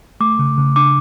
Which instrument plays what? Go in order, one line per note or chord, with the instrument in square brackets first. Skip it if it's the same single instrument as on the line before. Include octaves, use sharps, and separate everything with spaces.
[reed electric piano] A3 [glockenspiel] D6
[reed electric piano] C#3
C#3
[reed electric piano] D4 [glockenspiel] D6